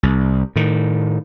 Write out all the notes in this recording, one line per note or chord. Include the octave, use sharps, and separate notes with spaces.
C2
A2 D#3